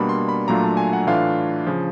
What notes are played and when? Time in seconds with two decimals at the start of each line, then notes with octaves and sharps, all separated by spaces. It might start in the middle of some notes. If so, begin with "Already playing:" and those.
Already playing: B2 G3 A#3 D4 B5
0.09 C6
0.29 B5
0.48 A#2 F#3 A3 D4 F4 A#5
0.63 A5
0.77 G#5
0.93 F#5
1.07 A2 E3 A3 D4 F4 F5
1.67 C#3 F3